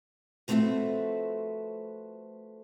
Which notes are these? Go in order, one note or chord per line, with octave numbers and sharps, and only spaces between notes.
F3 A3 C4 F#4 B4 E5